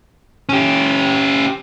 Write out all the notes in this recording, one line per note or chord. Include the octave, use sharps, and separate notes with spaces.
C#4 G4